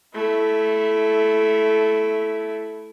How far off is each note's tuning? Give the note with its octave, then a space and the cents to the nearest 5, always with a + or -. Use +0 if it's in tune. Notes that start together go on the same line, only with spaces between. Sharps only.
A3 -15 E4 +5